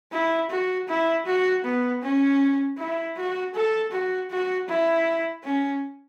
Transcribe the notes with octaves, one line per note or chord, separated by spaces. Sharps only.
E4
F#4
E4
F#4
B3
C#4
E4
F#4
A4
F#4
F#4
E4
C#4